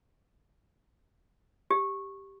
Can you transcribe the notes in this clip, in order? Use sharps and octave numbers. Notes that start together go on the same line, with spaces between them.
G4